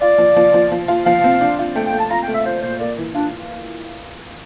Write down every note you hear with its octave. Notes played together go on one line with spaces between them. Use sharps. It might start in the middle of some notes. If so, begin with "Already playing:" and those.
F4 D5
F3
F3
F3
F3
F4
F3 F5
C4
D4
F4
A3 G5
G5
A3
A5
F4 A#5
G5
A3
E5
F4 C5
A#2 C5
A#3 D5
E3
D4 F4